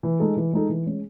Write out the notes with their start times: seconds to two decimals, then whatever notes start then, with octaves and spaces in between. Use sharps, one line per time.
0.03 E3
0.20 G#3 D#4 A4
0.36 E3
0.53 G#3 D#4 A4
0.69 E3
0.86 G#3 C#4